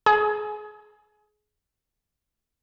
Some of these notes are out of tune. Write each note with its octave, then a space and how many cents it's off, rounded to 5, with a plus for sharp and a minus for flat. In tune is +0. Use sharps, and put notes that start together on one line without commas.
G#4 +25